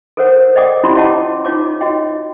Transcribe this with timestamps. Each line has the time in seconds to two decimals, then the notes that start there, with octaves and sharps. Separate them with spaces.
0.17 A4 A#4 C5 C#5 F#5
0.56 D5 D#5 F#5 G5 D6 D#6
0.84 C#4 E4 F4 G4 B5 C6
0.96 C#5 D#5 F#5 G5 A5 D6
1.45 D#4 F4 C#5 D6
1.81 F#4 D#5 G5